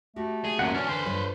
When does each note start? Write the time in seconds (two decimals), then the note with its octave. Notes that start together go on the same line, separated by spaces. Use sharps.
0.16 A3 F#4 G4
0.45 G#4
0.59 F#2 A#2 C#4 F#5
0.74 E3 C#4 D4 F6
0.88 D3 B4 C5
1.05 G2 F4 C#5